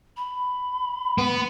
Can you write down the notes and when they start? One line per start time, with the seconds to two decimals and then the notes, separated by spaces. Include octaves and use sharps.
0.17 B5
1.18 B3